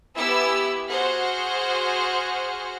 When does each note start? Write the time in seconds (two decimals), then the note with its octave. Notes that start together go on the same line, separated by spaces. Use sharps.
0.17 B3 E4 G4 B4 G#5 E6
0.90 F#4 G#4 C5 F#5 F6